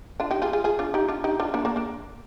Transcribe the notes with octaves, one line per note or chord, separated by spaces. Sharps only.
D4 F4
D#4 G4
F4 G#4
F4 G#4
F4 G#4
D4 F4
D#4 G4
D4 F4
D#4 G4
D4 F4
A#3 D4
A#3 D4
A#3 D4